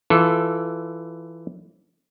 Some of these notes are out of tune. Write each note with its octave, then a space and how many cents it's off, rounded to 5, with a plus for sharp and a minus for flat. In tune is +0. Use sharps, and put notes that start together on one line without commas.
E3 +10 F4 +0 A4 +0